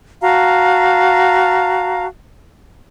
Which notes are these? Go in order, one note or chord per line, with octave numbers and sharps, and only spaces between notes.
F#4 F5 A5 A#5